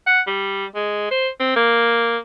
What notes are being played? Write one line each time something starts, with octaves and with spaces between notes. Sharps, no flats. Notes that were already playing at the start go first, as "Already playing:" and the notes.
F#5
G3
G#3
C5
C4
A#3